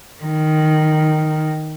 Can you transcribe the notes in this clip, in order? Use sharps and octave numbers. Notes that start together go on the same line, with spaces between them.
D#3